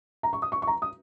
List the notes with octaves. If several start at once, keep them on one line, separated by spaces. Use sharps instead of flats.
A#5
C#6
D#6
C#6
C#6
A#5
D#6